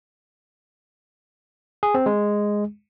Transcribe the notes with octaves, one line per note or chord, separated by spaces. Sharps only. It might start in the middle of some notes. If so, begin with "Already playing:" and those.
G#4
C4
G#3